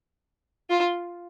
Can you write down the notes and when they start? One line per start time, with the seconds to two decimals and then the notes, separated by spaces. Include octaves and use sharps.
0.70 F4